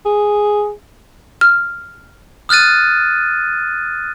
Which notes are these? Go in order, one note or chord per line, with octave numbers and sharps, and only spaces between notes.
G#4
F6
D#6 F6 F#6 A6 D#7